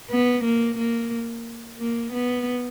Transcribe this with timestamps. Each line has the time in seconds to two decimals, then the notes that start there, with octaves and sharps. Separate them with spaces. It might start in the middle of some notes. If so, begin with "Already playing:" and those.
0.10 B3
0.44 A#3
0.78 A#3
1.79 A#3
2.13 B3